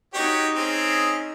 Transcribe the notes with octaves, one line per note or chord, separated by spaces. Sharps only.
D#4 F#4 G4 C#5
C4 C#4 G#4